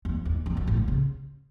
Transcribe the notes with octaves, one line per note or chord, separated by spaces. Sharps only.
F2
E2
F2
F#2
A2
A#2
C#3